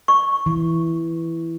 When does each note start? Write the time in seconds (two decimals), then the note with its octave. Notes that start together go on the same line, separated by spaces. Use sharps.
0.08 C#6
0.46 E3